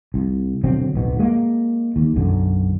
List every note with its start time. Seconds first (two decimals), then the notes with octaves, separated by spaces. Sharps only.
0.14 C2
0.63 B2 D3 F#3 C4
0.94 D1 B1 B2
1.20 G#3 A#3
1.96 D#2
2.16 B1 F#2 D3